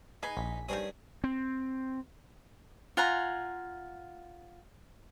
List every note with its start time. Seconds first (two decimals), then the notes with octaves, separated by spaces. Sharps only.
0.23 D#4 G#4 B4 G#5
0.37 A#1 B6
0.68 G2 D#3 C4 C#4 G#4 D#6
1.24 C4
2.97 F4 F#5 G#5 A#5